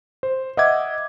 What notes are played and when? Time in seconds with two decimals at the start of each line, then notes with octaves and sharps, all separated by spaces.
0.23 C5
0.57 D#5 E5 F#5 D6 G#6